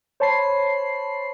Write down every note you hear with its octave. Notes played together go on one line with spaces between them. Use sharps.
C5 C#5 A5 B5 C7